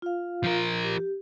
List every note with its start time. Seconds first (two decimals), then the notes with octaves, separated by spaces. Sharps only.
0.02 F4 F5
0.44 F3 A#4
0.85 G4